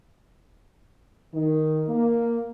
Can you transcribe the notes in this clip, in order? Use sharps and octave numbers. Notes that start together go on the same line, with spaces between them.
D#3
A#3